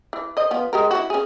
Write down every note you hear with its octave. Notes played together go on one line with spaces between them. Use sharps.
E3
C5 D#5
F3 B3 F4
G#3 G4 A#4
E4 F#4
C#4 G#4